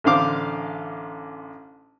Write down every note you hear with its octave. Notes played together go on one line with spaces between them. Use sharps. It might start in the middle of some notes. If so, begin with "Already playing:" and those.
A1 D3 C5 F5 D6